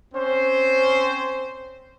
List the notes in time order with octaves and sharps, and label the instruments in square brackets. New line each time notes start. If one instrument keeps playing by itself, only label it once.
[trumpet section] C4 C#4 C5